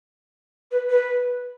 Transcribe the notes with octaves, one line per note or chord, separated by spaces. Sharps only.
B4
B4